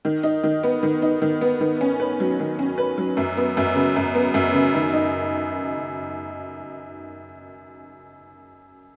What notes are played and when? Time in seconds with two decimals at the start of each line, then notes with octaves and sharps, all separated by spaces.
0.05 D#3
0.23 D#4
0.43 D#3
0.63 B3
0.83 D#3
1.02 D#4
1.22 D#3
1.41 B3
1.60 D#3
1.81 C#4
2.00 B4
2.20 F#3
2.40 D#3
2.59 C#4
2.78 B4
2.98 F#3
3.17 F#2
3.37 B3
3.57 F#2
3.75 C#3
3.96 F#2
4.15 B3
4.34 F#2
4.54 C#3
4.74 D#3
4.93 D#4